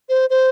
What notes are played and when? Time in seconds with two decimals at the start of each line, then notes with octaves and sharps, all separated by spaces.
0.09 C5
0.30 C5